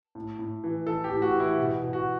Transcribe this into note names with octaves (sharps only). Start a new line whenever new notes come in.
A2
A2
E3
E3 A4
G4
A2
F#4
E3
E4
B2
B2
F#4